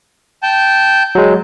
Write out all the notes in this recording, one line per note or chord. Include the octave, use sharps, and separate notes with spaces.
G5 A5 G6
F#3 G#3